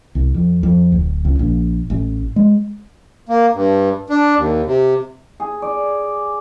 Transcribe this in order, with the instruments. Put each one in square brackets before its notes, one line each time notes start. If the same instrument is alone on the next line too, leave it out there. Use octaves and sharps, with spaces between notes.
[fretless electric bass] C2
F2
F2
D1
C#2
A#1
A1
G#3
[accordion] A#3
G2
D4
D#2
C3
[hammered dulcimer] G#4
D5